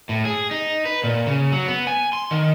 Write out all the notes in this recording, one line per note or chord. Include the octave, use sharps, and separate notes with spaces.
A2
G#4
D#4
B4
A#2
C#3
F#3
B3
G#5
C6
D#3